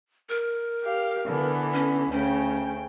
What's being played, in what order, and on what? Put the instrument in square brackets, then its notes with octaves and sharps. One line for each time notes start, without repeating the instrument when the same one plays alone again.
[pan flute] A#4
[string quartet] G4 F5
D3 E3 B3
[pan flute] C#4
[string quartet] D2 C#3 G5 [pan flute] C#4